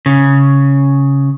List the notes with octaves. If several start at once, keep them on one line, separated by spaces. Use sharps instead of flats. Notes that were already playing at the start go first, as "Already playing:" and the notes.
C#3